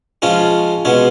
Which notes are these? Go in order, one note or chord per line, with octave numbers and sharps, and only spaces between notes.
F3 G#3 C#4 F4
B2 G#3 C#4